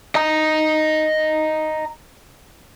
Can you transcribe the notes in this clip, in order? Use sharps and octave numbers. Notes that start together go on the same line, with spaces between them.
D#5 A#5